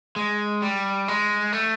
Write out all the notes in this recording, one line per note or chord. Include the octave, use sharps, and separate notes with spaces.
G#3
G3
G#3
A3